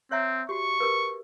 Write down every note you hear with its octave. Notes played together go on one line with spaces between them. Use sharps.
C4 C#5 E5 A#5
F#4 G4 C#6
G4 A#4 B4